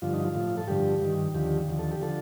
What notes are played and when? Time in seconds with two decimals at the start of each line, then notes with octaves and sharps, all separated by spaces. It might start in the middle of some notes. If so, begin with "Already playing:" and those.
0.02 G2 D3 F3 F4
0.13 D#4
0.25 F4
0.35 A2 F3
0.57 A4
0.68 G2 D3 F3 G4
1.02 G2 D#3
1.35 D#2 D3 F3 G4
1.68 D#2 D3 F3
1.79 A4
1.92 G4
2.01 D3 F3 A4